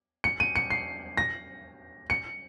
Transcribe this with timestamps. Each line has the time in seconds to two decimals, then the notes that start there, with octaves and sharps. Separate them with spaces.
0.24 C#7
0.40 D#7
0.56 C#7
0.70 C7
1.17 A#6
2.10 C#7